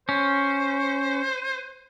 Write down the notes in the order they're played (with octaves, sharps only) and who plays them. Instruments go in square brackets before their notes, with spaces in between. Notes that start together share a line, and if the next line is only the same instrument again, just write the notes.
[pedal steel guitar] C#4 [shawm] C5